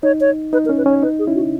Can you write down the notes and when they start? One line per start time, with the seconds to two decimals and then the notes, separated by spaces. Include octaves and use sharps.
0.03 D#4 C#5
0.21 C#5
0.53 D#4 B4
0.66 A#4
0.69 C#4
0.78 B4
0.86 C#4 C#5
1.03 D#4 B4
1.19 G#4
1.27 C#4 E4
1.35 F#4